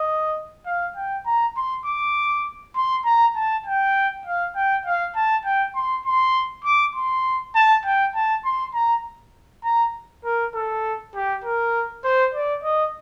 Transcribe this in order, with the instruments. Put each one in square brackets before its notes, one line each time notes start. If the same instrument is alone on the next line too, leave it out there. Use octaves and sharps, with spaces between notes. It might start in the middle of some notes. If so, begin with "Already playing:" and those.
Already playing: [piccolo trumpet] D#5
F5
G5
A#5
C6
D6
C6
A#5
A5
G5
F5
G5
F5
A5
G5
C6
C6
D6
C6
A5
G5
A5
C6
A#5
A#5
A#4
A4
G4
A#4
C5
D5
D#5